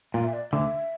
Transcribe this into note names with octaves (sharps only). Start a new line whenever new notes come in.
A#2 F5
E5
D5
D2 D3 E5